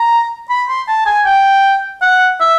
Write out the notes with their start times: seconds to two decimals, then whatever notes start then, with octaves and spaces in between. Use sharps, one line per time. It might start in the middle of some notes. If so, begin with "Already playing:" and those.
Already playing: A#5
0.50 B5
0.69 C6
0.88 A5
1.06 G#5
1.25 G5
2.02 F#5
2.41 E5